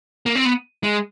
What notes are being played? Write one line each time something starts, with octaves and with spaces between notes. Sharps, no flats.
A#3
C4
B3
G#3